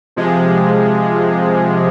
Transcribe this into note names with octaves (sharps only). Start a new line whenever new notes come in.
C3 F3 G#3